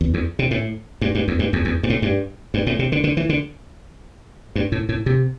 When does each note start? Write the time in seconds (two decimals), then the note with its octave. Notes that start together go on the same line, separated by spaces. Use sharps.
0.01 E2
0.14 E2
0.39 C3
0.51 A2
1.01 G2
1.15 G2
1.28 E2
1.39 G2
1.53 E2
1.65 E2
1.83 G2
1.90 A2
2.02 G2
2.54 G2
2.67 A2
2.79 C3
2.92 D3
3.04 D3
3.17 E3
3.29 D3
4.56 G2
4.72 A2
4.89 A2
5.06 C3